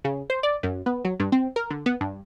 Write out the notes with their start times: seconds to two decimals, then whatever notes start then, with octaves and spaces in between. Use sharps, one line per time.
0.04 C#3
0.30 C5
0.43 D5
0.63 F#2
0.86 B3
1.05 F#3
1.20 G2
1.32 C4
1.56 A#4
1.70 D3
1.86 B3
2.01 G2